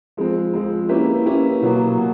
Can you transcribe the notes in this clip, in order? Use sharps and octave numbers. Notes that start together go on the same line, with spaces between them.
F3 G#3 C4
F3 G#3 C4
A#3 C#4 E4 G4 B4
A#3 C#4 E4 G4 B4
B2 F#3 A#3
B2